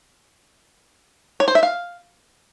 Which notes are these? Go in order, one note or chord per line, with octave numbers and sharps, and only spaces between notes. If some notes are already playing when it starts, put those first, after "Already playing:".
C#5
C5
E5
F5